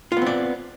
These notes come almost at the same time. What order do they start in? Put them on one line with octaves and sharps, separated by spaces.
F4 B3 C4 D5